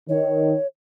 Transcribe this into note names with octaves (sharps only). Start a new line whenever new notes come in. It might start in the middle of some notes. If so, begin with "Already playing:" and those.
D#3 C#5